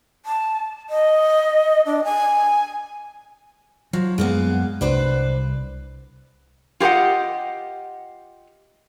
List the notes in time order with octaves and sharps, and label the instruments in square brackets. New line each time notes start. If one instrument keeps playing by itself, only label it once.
[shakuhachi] A5
D#5
D4
G#5
[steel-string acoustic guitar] F3 [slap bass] F#3
[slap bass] F#2 [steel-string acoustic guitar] G#3 A#3 B3
[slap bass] C2 [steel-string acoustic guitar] D4 B4 C5
[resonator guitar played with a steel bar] F4 G4 A#4 D#5 F#5